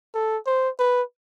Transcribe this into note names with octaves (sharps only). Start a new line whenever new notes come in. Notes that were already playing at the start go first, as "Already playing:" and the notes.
A4
C5
B4